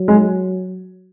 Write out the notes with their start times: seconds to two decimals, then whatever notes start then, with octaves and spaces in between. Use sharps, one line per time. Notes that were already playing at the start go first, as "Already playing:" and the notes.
Already playing: F#3
0.08 G#3